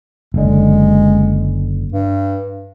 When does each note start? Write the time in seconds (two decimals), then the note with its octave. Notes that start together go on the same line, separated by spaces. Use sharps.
0.34 F#1 D3 G#3
1.92 G2